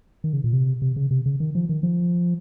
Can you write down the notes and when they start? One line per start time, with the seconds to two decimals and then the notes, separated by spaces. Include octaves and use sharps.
0.24 D#3
0.33 C#3
0.44 A#2
0.53 C3
0.82 C3
0.96 C#3
1.11 C3
1.26 C#3
1.40 D#3
1.55 F3
1.69 D#3
1.83 F3